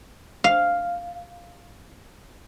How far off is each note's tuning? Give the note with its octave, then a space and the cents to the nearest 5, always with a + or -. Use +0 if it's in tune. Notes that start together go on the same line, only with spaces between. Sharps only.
F5 +0